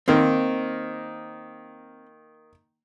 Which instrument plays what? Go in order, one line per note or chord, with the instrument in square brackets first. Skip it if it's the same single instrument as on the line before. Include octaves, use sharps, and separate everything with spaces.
[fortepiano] D#3 A#3 [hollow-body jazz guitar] C4